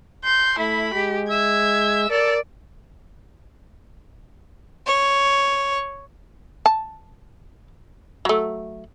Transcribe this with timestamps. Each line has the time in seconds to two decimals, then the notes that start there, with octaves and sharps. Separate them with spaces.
0.24 C6 G6
0.59 A3 E4 B5
0.94 G#3 G4
1.30 E5 G#6
2.10 A4 A#4 D5
4.87 C#5
6.66 A5
8.25 F#3 A3